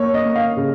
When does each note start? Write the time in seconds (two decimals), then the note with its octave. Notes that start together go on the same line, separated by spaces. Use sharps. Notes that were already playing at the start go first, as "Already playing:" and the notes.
Already playing: A#3 C#5
0.14 D#5
0.25 A#3
0.35 F5
0.56 C#3